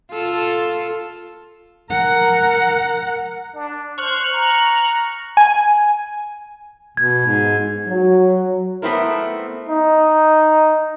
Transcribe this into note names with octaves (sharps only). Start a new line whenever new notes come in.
F4 A4
A#4 F#5
D4
C5 C#6 F6 F#6
A#5
G#5
B2 G#6
G#2
F#3
A3 B3 C4 E4 A#4
D#4